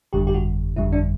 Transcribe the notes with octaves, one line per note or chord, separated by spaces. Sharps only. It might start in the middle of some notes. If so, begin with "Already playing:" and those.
G1 F2 D3 G3 G4
G4
F#4
G1 F2 D3 G3 E4
D4